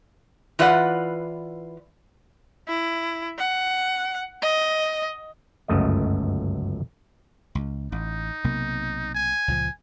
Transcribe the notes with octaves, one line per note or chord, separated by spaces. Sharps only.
E3 F4 B4 D5 E5 F#5
E4
F#5
D#5
G1 C#2 F#2 A3 D#5
C#2
A1 D#4
B1 C3 A#3
G#5
C#2 A#2 F3